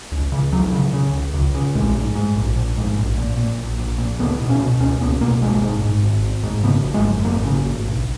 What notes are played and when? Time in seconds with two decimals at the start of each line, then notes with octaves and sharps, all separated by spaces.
0.12 C#2
0.32 C#3
0.52 C#2 F#3
0.72 C#3
0.93 C#3
1.13 C#2
1.34 C#2
1.54 C#3
1.74 A#1 G#3
1.95 G#2
2.15 G#2
2.35 A#1
2.56 A#1
2.77 G#2
2.97 A#1
3.17 A#2
3.37 A#2
3.58 A#1
3.78 A#1
3.98 A#2
4.19 C#2 B3
4.40 B2
4.49 C#4
4.60 B2
4.80 C#2 C#4
5.01 C#2 B3
5.21 B2 A#3
5.41 G#1 G#3
5.62 G#2
5.82 G#2
6.03 G#1
6.23 G#1
6.43 G#2
6.63 C#3 B3
6.84 G#1
6.94 G#3
7.05 F#2
7.25 G#1 A#3
7.45 C#3
7.65 G#1
7.85 B1